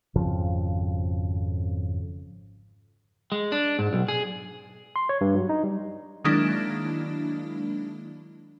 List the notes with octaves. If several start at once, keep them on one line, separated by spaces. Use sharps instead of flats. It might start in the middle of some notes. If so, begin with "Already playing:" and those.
G#1 F2 C#3 F3
G#3
D4
G#2
B1
G#4
C6
C#5
G2
F#3
D#4
G3
D#3 F#3 G#3 A#3 D4 E4